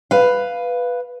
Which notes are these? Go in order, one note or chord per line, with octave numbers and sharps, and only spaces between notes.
B4 F5